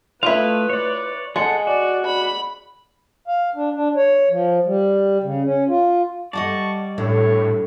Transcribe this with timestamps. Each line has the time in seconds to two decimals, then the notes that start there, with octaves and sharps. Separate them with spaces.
0.23 A3 E4 F4 B4 D#5 F5
0.69 C#5 D5
1.36 G#3 G#4 A4 F#5
1.67 F#4 D5
2.05 B5
3.28 F5
3.56 D4
3.72 D4
3.96 C#5
4.31 F3
4.66 G3
5.23 C#3
5.45 C#4
5.68 F4
6.33 G3 D5 D#5 F#5 A5 C#6
6.98 A2 D3 C#5